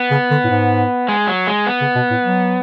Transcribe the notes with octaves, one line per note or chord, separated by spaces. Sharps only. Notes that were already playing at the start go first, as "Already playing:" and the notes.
Already playing: B3
C#3
D3
A2
G#2
G#3
F#3
G#3
B3
C#3
B2
A2
F#3